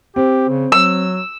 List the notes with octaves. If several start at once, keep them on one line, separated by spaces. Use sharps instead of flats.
C4 G4
C#3
F#3 E6